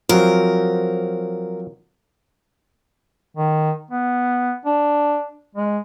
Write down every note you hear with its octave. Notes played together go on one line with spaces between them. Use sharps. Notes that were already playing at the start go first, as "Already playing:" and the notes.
F3 F#3 C4 A#4
D#3
B3
D4
G#3